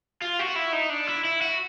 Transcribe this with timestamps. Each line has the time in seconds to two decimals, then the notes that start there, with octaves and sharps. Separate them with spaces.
0.22 F4
0.39 F#4
0.56 E4
0.73 D#4
0.90 D4
1.07 E4
1.25 E4
1.41 F#4